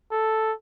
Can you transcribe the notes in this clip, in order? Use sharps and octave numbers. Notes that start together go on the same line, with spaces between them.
A4